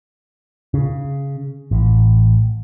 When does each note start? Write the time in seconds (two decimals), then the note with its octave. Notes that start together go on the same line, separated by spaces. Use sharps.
0.74 C#3
1.71 A1